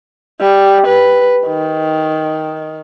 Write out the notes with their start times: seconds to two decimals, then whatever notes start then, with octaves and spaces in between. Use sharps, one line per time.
0.41 G3
0.87 B4
1.47 D#3